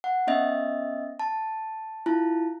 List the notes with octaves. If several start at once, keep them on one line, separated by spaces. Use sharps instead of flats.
F#5
B3 C#4 D#5 E5
A5
E4 F4 A5